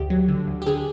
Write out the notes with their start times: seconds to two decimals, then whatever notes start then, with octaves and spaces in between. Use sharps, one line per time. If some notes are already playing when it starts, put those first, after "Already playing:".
Already playing: D2 G4
0.10 F#3
0.28 D3
0.47 D2
0.62 G4
0.66 D3 G#4